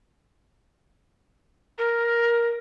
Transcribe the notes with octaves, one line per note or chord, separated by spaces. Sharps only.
A#4